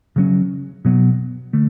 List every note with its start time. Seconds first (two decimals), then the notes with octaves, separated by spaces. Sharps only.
0.16 C#3 F#3 C#4
0.85 B2 F#3 B3
1.53 D3 A3